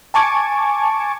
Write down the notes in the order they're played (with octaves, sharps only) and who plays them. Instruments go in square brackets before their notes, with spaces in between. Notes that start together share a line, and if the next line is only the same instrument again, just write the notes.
[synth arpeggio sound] G#5 A5 C#6 D6 G#6